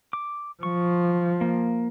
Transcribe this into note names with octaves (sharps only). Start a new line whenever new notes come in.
D6
F3 C#6
A#3